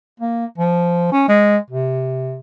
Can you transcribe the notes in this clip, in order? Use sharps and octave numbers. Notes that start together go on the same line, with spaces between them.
A#3
F3
C#4
G#3
C3